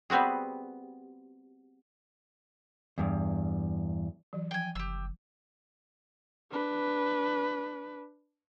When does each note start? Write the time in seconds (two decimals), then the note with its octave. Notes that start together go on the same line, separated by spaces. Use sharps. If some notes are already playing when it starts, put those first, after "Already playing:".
0.10 G3 B3 C4 F#4 G#4
2.98 E2 G2
4.33 E3 F#3
4.51 F3 G5 G#5
4.75 F#1 G4 E6
6.51 D4 B4